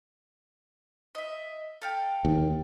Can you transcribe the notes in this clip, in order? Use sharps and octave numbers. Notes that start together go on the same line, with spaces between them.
D#5 E5
A4 F5 G5
D#2